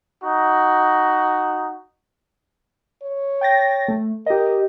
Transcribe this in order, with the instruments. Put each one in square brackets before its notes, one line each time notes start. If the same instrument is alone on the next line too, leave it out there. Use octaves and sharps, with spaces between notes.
[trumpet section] D#4 F#4
[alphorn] C#5
[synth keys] G5 A6 A#6
A3
[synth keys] G4 D#5 [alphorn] A#4